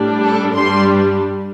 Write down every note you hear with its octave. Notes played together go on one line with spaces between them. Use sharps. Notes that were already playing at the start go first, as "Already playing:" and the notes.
Already playing: A2 G3 D4
A4
G2 G3 D4 C6